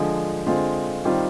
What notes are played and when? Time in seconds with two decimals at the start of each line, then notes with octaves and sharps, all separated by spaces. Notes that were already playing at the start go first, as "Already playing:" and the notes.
Already playing: D3 F3 G#3
0.47 D3 G#3 C4 F4
1.05 D#3 G3 C4 F4